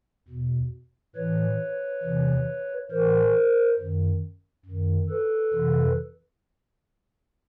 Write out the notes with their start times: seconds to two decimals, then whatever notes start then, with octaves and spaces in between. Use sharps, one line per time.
0.29 E2 B2
1.16 A2 E3 B4 C#5
2.03 E2 C3 E3
2.91 A2 E3 A#4 C5
3.79 F#2 D#3
4.66 F#2 D#3
5.09 A4 B4
5.54 F2 C3 E3